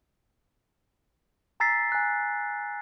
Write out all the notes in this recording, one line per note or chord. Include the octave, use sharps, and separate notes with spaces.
G#5 A#5 E6 A6 B6 C7
G#5 F#6